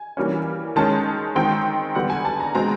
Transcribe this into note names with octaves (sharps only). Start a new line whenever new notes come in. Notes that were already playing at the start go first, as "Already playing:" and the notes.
Already playing: G#5
E3 G3 A#3 C#4
D#3 G#3 C#4 A5
D#3 G#3 C4 G5
D3 G3 B3 F#5
G#5
A5
A#5
B2 G#3 C4 A#5